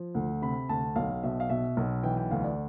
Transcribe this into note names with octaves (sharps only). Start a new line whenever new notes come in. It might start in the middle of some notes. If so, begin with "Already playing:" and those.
Already playing: F3
D2
C3 B5
D2 A5
B1 F5
B2 E5
F5
B2 E5
B1
E3 G5
G5
D2 F5
D5